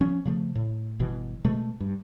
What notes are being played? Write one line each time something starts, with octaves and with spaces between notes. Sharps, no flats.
F3 C#4
C#3 F3 A3
A2
G1 B2 E3
B2 G#3 A3
G2